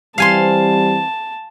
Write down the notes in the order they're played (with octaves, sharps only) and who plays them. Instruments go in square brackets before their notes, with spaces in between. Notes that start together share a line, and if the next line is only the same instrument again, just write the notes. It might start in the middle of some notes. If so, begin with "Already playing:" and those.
[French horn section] E3 C4 [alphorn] G3 [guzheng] F5 G#5 C6 [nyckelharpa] A5